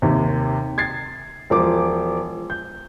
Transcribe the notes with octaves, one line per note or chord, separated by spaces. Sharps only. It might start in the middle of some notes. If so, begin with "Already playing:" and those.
D#2 C3
G#6 A6 C7
E1 F3 D6
G6